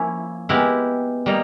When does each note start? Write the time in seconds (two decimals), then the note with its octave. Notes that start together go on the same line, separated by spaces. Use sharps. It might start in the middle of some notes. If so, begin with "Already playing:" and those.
Already playing: F3 A#3 C#4 E4
0.49 G#3 B3 E4 G4 A#4
1.26 G3 A#3 D#4